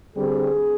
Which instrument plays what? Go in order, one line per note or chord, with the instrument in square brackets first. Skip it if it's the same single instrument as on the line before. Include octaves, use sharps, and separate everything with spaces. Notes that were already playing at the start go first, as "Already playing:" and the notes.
[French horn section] D3 G3 C4 G#4